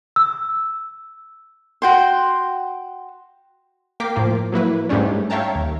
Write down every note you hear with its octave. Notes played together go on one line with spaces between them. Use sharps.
E6
F#4 G5 C6
A#3 A#4 G5 D6 B6 C7
A2 F3 A#3
F#3 A#3 E4 B4
G#2 G3 A3 C#4 D4
C#5 E5 F5 G5 A5 A#5
D#2